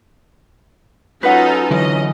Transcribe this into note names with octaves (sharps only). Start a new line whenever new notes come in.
F#3 C#4 D#4 F4 A4 B4 F#5
D3 E3 F#3 C#4 D#5